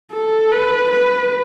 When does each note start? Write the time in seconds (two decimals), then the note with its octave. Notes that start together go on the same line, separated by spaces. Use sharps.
0.12 A4
0.51 B4
0.91 B4